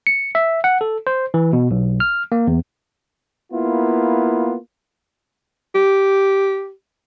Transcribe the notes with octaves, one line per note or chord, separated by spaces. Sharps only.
C#7
E5
F#5
A4
C5
E3
B2
B1
F6
A#3
E2
A#3 B3 E4 F4
G4